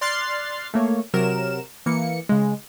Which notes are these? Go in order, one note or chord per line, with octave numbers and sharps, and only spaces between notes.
D5 C6 F6 F#6 A6 C7
A3 A#3 C#5
C3 F#3 A#4 E7
E3 A#3 C#7
C#3 G#3